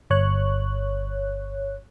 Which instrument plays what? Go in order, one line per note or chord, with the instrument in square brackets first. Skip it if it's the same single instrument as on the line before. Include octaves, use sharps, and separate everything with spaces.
[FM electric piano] G1 C#5 F#6